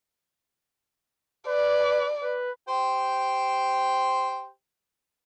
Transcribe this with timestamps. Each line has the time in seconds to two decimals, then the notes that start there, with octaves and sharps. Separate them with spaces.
1.47 B4 D5
2.22 B4
2.68 G4 C5 G5